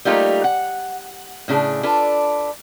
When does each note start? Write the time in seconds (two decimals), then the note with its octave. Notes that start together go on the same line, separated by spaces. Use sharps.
0.05 G3 A3 A#3 D#4 F4 G4
0.44 F#5
1.48 A2 C#3 D4 G#4
1.83 D4 F4 A4 B4